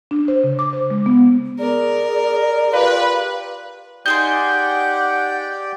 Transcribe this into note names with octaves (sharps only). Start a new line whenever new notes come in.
D4
C5
C#3
D6
C5
G#3
B3
G#4 A#4 D5
F4 G4 B4 F5
D#4 G4 G#4 D5 F#5 G5 C6 G6